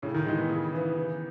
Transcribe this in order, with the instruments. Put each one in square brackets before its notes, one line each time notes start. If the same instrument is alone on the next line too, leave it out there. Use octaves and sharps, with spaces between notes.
[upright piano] A2 [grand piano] C#3
[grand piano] D#3
[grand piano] E3 [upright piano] G#3 D#4
[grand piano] B3
[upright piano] C#3
E3 B3
E3